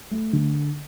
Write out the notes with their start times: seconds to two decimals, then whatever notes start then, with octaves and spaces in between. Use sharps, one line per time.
0.11 A3
0.33 D3